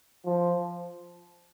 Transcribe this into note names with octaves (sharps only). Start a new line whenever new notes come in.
F3